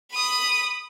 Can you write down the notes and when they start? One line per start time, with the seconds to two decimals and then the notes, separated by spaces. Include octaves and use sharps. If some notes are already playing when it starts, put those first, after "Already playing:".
0.12 B5 D#6